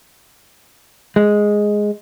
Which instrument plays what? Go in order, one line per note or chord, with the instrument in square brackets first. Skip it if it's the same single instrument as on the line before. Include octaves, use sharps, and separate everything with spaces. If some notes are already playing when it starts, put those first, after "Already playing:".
[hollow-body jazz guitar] G#3